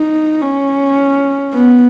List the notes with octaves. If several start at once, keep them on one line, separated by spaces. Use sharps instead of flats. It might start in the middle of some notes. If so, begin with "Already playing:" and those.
Already playing: D#4
C#4
B3